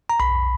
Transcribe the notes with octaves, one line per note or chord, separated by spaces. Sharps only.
A#5
B1 B5